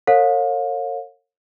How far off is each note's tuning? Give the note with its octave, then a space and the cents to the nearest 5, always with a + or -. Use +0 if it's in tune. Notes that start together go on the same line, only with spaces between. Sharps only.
A#4 -40 C#5 -25 F5 +35